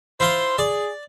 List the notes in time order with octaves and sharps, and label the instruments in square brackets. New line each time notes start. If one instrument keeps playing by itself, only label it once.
[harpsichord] E4 F4 C6 [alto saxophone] C5
[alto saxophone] G#4 [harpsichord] D5